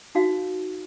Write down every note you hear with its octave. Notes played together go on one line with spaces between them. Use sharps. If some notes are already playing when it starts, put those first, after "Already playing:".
D#4 F#4 F5